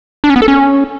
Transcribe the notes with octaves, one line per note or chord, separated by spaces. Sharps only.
D4
C#4
B3
A4
C#4